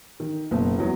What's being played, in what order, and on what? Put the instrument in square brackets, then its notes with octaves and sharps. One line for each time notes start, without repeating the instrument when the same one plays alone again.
[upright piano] D#3
F#1 B2
E2 F#3